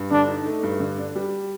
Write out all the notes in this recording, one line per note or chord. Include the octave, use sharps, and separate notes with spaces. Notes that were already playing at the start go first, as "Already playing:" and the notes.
Already playing: G2
D3 D4
D#4
A3
G2
D3
D4
G3